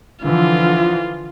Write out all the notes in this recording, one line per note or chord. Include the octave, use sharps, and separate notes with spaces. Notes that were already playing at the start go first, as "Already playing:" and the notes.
D3 E3 F3 F4